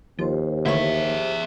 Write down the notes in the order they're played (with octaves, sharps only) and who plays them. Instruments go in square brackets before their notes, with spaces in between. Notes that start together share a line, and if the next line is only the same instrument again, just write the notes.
[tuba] D#2 [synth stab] F3 [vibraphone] G4 C5
[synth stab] D2 E3 C#5 [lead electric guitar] G#4 E5